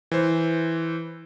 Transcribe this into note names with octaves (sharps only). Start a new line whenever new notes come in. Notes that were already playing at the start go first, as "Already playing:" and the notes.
E3 C5